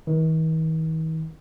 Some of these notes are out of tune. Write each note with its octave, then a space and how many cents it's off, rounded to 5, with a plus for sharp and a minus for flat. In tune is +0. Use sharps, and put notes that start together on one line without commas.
D#3 +45